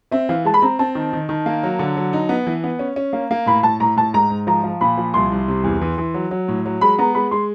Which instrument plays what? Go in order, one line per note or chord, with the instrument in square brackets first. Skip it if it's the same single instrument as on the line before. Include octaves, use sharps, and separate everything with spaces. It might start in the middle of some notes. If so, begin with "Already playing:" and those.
[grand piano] C4 [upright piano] E5
[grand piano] E3 [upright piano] F5
[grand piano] G#3 [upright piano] A5
[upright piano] B5
[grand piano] C4 [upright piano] A#5
[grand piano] C4 [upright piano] A5
[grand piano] D#3
D#3
D#3
A#3
F#3
D3
F#3
D#4
B3
E3
B3
C#4
C#4
A#3
A#3
[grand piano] A2 [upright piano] B5
[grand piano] A2 [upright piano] A5
[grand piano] A2 [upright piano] A#5
[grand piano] A2 [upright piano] A5
[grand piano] G#2 [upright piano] A#5
[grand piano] G#2
[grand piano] F3 [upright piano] A#5
[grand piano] F3
[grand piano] A#2 [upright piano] B5
[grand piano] F3
[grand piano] C2 [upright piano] C6
[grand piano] C2
C3
E2
E3
E3
F#3
F#3
A2
F#3
[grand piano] G#3 [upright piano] B5
[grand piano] B3 [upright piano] A#5
[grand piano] G#3 [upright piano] B5
[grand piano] G#3 [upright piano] C6